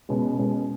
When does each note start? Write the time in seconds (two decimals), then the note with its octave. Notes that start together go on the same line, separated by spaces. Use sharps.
0.09 B2 G#3 C#4
0.38 B2 G#3 C#4